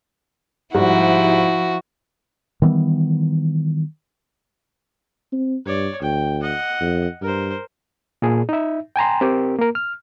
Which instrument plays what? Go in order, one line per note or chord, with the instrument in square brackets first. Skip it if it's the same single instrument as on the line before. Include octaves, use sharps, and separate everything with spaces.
[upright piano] G#2 G3 [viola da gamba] F3 E4 [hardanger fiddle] F#4
[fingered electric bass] D#3 E3 G3 B3
[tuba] C4
[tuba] G2 [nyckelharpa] C#5 D5
[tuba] D2 [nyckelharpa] G5
[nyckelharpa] D#5 F#5
[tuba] F2
[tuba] G2 [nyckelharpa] A#4 C5
[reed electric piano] A#2 G#4
D#4 E5
G5 G#5 A#5 C6
C4 G4 A#4
A#3 A#4
F6